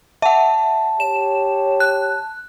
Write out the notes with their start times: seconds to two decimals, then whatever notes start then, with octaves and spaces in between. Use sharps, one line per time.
0.22 E5 F#5 A5
1.00 G4 C#5 E7
1.80 F#6